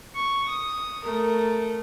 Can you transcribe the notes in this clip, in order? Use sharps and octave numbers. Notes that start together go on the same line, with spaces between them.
C#6
D#6
A3 A#4